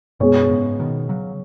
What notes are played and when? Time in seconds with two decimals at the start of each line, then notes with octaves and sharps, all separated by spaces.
0.20 F#2 B2 G#3 B3 G#4 C#5
0.50 G#2 C#3
0.79 B2 D#3
1.09 C#3 F#3